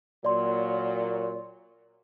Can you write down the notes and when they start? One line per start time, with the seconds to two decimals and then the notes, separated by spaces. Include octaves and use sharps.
0.25 A#2 F#3 D5 C6